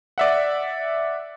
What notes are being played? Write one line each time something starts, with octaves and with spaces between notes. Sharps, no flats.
D5 E5 F#5